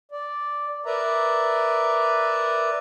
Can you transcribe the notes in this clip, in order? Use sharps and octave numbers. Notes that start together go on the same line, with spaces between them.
D5
A#4 B4 D5 E5 A#5